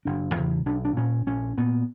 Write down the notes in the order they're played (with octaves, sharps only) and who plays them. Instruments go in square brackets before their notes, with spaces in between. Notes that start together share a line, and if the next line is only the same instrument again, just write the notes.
[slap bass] F#1 D4
E2 C#3
B1 D4
D4
A#2 C#4
A#1 C#4
A#2 B3